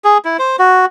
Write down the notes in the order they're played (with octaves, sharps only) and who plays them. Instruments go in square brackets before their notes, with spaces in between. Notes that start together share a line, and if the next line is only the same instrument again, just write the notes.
[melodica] G#4
E4
C5
F#4